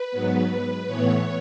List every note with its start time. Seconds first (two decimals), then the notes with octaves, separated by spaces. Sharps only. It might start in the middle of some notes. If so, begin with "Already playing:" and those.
Already playing: B4
0.11 G#2 F#3 B3
0.87 A2 E3 B3 C#5